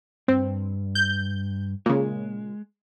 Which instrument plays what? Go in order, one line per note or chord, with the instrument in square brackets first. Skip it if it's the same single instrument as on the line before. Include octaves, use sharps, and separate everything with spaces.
[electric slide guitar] G2 [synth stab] C4
[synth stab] G6
[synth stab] A#2 C#3 [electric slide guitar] G#3